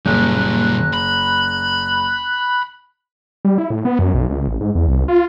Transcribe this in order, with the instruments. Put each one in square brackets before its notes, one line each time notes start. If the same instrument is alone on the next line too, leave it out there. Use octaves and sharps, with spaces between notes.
[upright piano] F#1 [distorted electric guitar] A#2 G3 [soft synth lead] F#6
[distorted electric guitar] B5
[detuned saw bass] G3
E4
A2
B3
F#2
B1
C#2
A1
G#2
E2
C2
F4